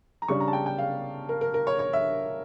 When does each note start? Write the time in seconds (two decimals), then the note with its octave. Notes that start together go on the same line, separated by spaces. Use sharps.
0.22 A#5
0.28 C#3 G3 D4 C#6
0.40 A#5
0.48 A5
0.53 G5
0.66 G5
0.78 F5
1.29 A#4
1.41 A#4
1.54 A#4
1.67 C#5
1.79 C#5
1.93 E5